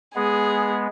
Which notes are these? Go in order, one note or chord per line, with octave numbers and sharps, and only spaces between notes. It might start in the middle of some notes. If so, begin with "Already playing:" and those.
G#3 B3 G#4